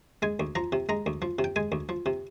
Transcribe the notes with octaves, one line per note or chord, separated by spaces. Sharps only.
G#3 G#5
D2
F3 A#5
C3
G#3 A#5
D2
F3
C3
G5
G#3 G#5
D2
F3
C3